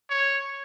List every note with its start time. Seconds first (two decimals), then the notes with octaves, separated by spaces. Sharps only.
0.10 C#5